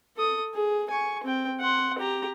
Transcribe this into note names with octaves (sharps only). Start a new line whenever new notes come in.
A4 D#6
G#4
G#5 C#6
C4 G5
F#5 C6
G4 A#5